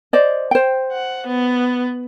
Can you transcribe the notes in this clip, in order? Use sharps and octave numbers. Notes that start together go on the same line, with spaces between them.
C5 D5 D#5
C5 G5
F#5
B3